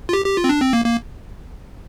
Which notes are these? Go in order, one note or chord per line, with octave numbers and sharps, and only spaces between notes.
F4
G4
G4
F4
C4
D4
C4
A#3
A#3